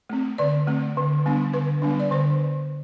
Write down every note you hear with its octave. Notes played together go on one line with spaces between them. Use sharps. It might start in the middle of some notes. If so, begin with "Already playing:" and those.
A3 C4
D3 D5
A3 C4
D3
G3 B3 D4
D3 B4
G3 B3 D4
D5
D3 C5